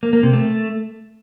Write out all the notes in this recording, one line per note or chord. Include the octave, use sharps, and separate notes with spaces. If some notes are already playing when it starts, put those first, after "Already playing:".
A#3
A#3
C3
A3